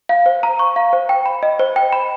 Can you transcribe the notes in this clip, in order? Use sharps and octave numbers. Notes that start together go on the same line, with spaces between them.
F5
C5
A#5
C#6
F5
C5
G5
B5
D#5
C5
G5
B5